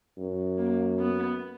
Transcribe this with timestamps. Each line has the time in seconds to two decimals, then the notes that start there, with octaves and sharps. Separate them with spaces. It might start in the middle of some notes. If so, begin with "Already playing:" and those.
0.18 F#2
0.58 A#3
0.99 B3